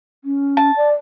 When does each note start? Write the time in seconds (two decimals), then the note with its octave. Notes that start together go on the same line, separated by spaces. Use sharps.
0.24 C#4
0.57 A5
0.76 D5